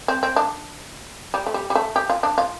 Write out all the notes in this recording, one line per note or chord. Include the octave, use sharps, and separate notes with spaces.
C4
C4
D4
G3
A3
G3
G3
A3
G4
F4
D4
F4